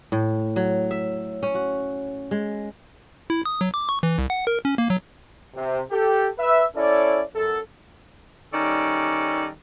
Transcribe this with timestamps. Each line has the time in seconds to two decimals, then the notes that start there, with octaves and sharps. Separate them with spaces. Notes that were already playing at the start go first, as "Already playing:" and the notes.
0.12 A2
0.56 F#3
0.91 E5
1.43 C#4
1.55 F#4
2.31 G#3
3.30 E4
3.45 D#6
3.61 F#3
3.74 D6
3.89 C#6
4.03 E3
4.18 C2
4.30 F#5
4.47 A#4
4.65 C#4
4.78 A#3
4.90 F#3
5.55 C3
5.91 G4 A4
6.39 B4 E5
6.76 C#4 E4 A4 C#5 D5
7.34 F#2 A4
8.53 D#3 G3 C#4 A4 D5